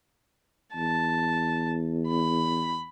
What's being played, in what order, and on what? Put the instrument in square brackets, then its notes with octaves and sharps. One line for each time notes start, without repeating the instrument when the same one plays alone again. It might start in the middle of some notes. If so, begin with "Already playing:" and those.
[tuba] E2 [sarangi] A5
[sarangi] B5